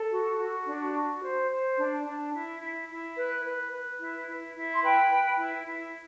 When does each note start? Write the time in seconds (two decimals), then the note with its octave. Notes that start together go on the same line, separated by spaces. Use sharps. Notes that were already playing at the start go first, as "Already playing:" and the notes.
Already playing: A4
0.11 F#4
0.38 F#4
0.66 D4
0.94 F#4
1.22 C5
1.50 C5
1.77 D4
2.05 D4
2.33 E4
2.61 E4
2.88 E4
3.16 B4
3.44 B4
3.71 B4
3.99 E4
4.27 E4
4.55 E4
4.74 C6
4.82 B4 G5 B5
5.10 B4
5.38 E4
5.66 E4